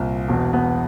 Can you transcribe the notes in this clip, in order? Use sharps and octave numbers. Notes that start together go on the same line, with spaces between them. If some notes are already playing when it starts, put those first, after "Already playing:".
Already playing: C2 A#2
E1 E2 B2
B3